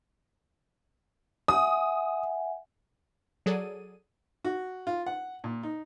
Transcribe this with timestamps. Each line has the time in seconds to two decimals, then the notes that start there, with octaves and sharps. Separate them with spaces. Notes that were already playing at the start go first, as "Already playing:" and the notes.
1.48 E5 F#5 G#5 D#6
3.46 F#3 G#4 A4 D5 D#7
4.45 F#4
4.87 F4
5.06 F#5
5.44 A#2
5.63 D#4